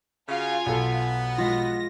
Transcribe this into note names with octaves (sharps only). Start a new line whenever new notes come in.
C#3 F4 F#4 F5 G#5
B1 B3 A4
G#3 F4 A#6